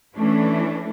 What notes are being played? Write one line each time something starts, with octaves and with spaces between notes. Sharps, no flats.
E3 A3 C#4 D4 E4